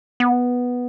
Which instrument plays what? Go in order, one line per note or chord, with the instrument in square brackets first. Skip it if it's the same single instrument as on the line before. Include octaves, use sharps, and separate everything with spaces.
[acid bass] B3